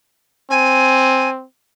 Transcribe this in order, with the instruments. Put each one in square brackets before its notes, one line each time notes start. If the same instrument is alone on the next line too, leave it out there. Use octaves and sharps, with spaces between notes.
[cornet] C4 [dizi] G#5